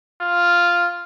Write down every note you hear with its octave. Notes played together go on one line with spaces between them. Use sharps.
F4